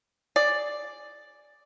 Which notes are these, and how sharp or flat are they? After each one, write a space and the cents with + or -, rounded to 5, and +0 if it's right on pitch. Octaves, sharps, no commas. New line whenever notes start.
G#4 +0 D5 +0